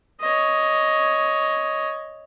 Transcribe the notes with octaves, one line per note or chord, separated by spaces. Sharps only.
C#5 D#5